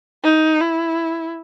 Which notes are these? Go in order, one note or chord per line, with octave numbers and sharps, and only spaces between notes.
D#4
E4